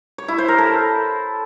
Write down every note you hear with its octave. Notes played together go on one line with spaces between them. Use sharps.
C#5
E4
C5
A#4
A4